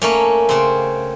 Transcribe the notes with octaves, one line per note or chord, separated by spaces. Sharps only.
A3 A#3 C#4
C#3 C4